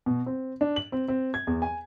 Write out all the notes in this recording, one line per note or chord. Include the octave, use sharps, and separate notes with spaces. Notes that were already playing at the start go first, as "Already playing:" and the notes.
B2
C4
D4
F#7
C4
C4
G#6
E2
G#5